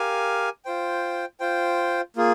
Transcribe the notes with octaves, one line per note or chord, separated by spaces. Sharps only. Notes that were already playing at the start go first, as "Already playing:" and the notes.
Already playing: G4 A#4 F5 G#5
F4 C5 G5
F4 C5 G5
A#3 F4 G#4